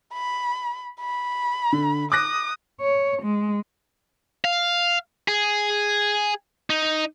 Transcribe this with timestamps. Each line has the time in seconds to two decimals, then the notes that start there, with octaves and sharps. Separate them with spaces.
0.13 B5
1.01 B5
1.72 D3
2.12 D6 D#6 F#6 A#6
2.81 C#5
3.23 G#3
4.45 F5
5.28 G#4
6.70 D#4